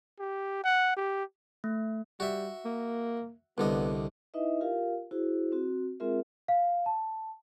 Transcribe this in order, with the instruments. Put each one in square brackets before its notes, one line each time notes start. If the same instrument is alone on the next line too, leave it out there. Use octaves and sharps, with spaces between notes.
[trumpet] G4
F#5
G4
[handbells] A3
[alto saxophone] G3 [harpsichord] F#4 E5
[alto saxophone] A#3
[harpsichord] C2 D3 D#5 [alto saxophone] B3
[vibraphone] D#4 E4 B4 D#5 E5
F4 G4 A#4 F5
E4 F#4 G#4 C5
C4 F#4
G#3 C4 F4 G#4 A#4 E5
[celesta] F5
A5